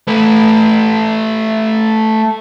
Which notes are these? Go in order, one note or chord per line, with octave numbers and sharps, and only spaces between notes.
A3 B4